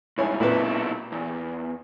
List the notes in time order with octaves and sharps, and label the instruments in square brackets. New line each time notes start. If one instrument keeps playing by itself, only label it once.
[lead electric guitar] C2 G#2 [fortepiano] E4 C#5 G#5
[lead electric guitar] B1 E4 [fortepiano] A#2 C4 B4
[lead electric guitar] E2